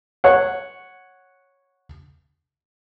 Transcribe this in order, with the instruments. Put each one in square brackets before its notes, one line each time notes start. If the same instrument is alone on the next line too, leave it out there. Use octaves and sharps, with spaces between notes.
[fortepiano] C#5 F#5